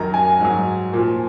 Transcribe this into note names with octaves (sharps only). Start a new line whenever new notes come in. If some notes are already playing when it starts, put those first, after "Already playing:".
Already playing: F#2 D#3 F#3 A#5
G#5
G#2 F#3
A#2 F3